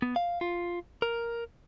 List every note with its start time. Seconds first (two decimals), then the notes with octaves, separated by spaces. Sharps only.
0.02 B3
0.16 F5
0.41 F4
1.02 A#4